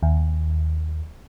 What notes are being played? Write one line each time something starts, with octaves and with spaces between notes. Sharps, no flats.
D#2